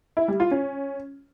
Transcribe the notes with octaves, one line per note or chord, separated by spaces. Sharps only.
E4
G3
F4
C#4